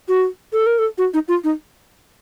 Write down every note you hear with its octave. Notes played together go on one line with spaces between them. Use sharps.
F#4
A4
A#4
A4
F#4
D#4
F4
D#4